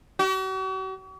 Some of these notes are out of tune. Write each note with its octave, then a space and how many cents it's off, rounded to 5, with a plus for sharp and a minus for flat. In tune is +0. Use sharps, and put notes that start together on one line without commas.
F#4 +45